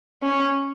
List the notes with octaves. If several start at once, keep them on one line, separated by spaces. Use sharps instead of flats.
C#4